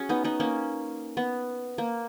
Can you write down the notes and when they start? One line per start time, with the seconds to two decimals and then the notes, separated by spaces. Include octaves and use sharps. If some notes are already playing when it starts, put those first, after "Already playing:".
Already playing: C#4 F#4 G#4
0.09 B3 D#4
0.24 B3 D#4
0.40 A#3 C#4
1.17 B3
1.78 A#3